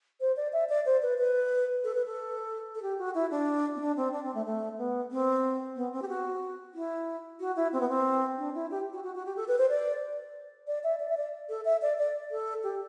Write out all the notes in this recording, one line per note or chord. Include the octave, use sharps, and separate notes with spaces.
C5
D5
E5
D5
C5
B4
B4
A4
B4
A4
A4
G4
F#4
E4
D4
C4
D4
C4
D4
C4
A3
A3
B3
C4
B3
C4
G4
F#4
E4
F#4
E4
C4
B3
C4
D4
E4
G4
F#4
F#4
F#4
G4
A4
B4
C5
D5
D5
E5
D5
E5
D5
A4
E5
D5
D5
A4
G4